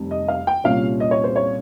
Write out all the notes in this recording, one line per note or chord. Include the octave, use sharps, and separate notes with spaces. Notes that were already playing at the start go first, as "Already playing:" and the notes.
Already playing: F1 F2 C3 G3
D#5
F5
G5
C2 A#2 G3 C#4 F4 F5
D#5
C#5
C5
C#5